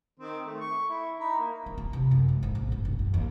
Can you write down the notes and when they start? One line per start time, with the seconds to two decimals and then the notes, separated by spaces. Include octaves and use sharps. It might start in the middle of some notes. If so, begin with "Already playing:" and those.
0.19 D#3 C4
0.46 A3
0.60 C#6
0.89 E4
1.20 D#4 A#5 B5
1.38 A#3
1.66 C4
1.78 F4
1.93 C3
2.11 F#2
2.29 G#2
2.43 G#1
2.55 A#1
2.72 F#1
2.85 B1
2.99 F#2
3.14 D#2